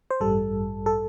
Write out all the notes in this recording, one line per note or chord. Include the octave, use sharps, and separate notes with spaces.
C5
A1 G2 G3 A4
A4